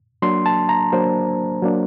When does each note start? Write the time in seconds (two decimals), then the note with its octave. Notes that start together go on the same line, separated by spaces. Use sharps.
0.22 F#3 A#3 D4 C6
0.46 A5
0.69 A#5
0.93 F#3 A#3 D4 C5
1.62 F#3 A#3 D4